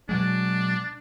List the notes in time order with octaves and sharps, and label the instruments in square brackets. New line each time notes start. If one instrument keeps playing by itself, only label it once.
[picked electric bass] B2 F#3 G#3 [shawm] D4